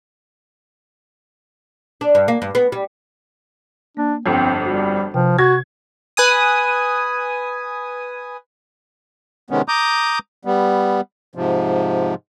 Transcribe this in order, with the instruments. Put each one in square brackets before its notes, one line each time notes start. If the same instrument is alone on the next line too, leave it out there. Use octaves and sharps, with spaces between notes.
[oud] D4
G2
A#3
G2
B3
G3
[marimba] A#3 [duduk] D4
[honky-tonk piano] G1 F2 [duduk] C4
[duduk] G3 [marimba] F#4
[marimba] C3 B4 G5 [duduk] F3
[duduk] F#4 [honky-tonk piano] G#6 [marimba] A#6
[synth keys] B4 G#5 D#6
[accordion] C3 D#3 G#3 B3 C#4
A#5 D6 D#6 G6
G3 B3
G#2 C3 F3